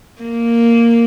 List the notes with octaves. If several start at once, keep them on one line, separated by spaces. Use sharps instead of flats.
A#3